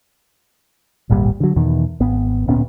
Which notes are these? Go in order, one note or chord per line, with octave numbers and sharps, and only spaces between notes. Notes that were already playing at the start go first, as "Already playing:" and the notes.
D1 G#1 A#2 G3
D3 F#3
E2 B2 D#3
G#1 B3
D1 A#2 B3 C#4